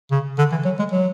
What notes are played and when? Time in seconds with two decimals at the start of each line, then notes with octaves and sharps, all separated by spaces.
0.11 C#3
0.38 D3
0.52 E3
0.65 F#3
0.79 G#3
0.91 F#3